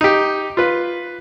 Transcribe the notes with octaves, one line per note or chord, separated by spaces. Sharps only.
D#4 G4
F4 B4